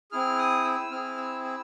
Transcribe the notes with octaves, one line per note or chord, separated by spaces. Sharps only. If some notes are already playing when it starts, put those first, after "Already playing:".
C4 E4 G#4 F6
D#6
E6
C4 E4 G#4 F6
E6
E6